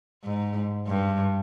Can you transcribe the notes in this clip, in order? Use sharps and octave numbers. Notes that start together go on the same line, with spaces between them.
G#2
G2